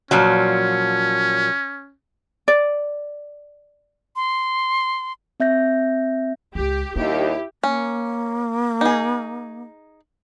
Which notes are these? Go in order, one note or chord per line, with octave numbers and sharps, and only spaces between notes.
A#2 F3 F#3 C#4
D5
C6
C4 E5 G6 A#6
C#2 G#3 G4
D#2 G3 D4 E4 G4
A#3 C#4
D#4 G#4